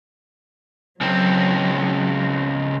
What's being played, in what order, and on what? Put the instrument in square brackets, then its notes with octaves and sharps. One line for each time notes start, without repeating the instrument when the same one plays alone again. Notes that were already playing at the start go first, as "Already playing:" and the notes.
[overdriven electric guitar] C#2 C4 [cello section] F#3